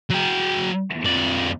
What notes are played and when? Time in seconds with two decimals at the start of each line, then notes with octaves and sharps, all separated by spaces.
0.10 F#3 G5
1.06 F2 D5